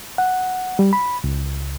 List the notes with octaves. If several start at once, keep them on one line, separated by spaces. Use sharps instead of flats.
F#5
G3
B5
C#2